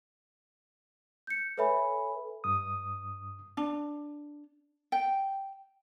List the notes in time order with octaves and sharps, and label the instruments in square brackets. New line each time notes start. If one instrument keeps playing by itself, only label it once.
[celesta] G6 C#7
A4 B4 C#5 E5 G#5 B5
[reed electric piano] G2 D#6
[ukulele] D4
G5